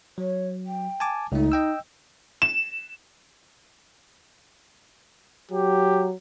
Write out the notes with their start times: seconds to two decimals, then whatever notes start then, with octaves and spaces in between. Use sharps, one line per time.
0.18 F#3 C#5
0.67 G5
1.00 G#5 A5 D6
1.32 C#2 A3 D#4
1.52 D#5 G5 E6
2.42 E7
5.51 F#3 G4